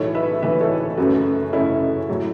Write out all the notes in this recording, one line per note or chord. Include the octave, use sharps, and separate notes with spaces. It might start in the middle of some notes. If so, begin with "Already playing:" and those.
Already playing: B1 A2 E3 A4 C#5
B4 E5
B1 A2 E3 B4 E5
A4 C#5
F#2 C#3 A3 C#4 F#4 B4
F#2 C#3 A3 C#4 E4 A4
A2 F#3 A3